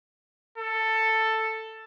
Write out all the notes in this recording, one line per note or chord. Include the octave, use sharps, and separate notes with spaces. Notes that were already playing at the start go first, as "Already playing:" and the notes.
A4